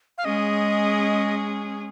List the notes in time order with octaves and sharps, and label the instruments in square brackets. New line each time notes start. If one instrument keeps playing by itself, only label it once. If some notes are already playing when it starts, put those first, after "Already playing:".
[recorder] F5
[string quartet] G#3 C#4 G#4 [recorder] D#5